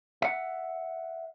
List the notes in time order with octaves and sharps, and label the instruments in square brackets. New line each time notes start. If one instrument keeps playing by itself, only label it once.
[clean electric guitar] E5 F#5